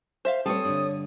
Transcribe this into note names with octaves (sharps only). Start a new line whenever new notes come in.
C5 E5 F5
G3 C4 A4 C#5 D#6
G2 D3